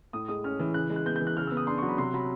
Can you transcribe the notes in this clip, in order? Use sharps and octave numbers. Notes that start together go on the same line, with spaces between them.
A2 D#6
G#3 D#6
C#4 F6
E3
C#3 F#6
G#3
F#6
B3 G6
G6
E3
F#6
C#3 F6
B3 E6
D#6
D4 C6
F#3 C#6
B5
C3 C6
F#3 B5